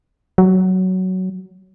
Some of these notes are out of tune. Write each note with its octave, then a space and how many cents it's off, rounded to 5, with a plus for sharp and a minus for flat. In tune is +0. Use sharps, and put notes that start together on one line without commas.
F#3 +10